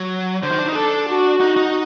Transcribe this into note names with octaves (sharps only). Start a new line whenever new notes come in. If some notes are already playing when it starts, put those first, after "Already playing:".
Already playing: F#3
D3 C5
D#3
D4
D#4
D4 A4
F#4
D#4
D#4